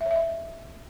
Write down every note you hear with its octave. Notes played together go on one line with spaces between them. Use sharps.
E5
C#5
E5
D#5